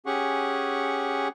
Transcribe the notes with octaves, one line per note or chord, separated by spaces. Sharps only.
C#4 G4 G#4 F#5 C#6